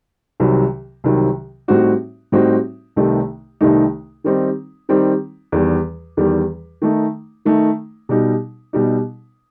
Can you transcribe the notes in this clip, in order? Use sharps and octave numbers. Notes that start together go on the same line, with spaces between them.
C2 C3 D#3 F#3
C2 C3 D#3 F#3
A2 G3 C4 D#4 F#4
A2 G3 C4 D#4 F#4
C2 C3 D#3 A3 D#4
C2 C3 D#3 A3 D#4
D#3 G3 C4 D#4
D#3 G3 C4 D#4
E2 D#3 G3
E2 D#3 G3
D#3 A3 D#4
D#3 A3 D#4
B2 G3 D#4
B2 G3 D#4